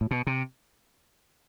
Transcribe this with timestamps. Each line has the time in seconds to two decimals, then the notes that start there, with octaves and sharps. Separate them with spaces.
0.01 A2
0.11 B2
0.27 C3